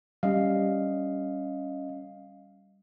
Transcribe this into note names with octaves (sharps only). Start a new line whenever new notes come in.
G3 C#4 D#5 F5